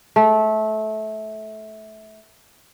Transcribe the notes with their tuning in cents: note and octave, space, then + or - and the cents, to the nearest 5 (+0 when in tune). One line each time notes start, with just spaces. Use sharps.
A3 -20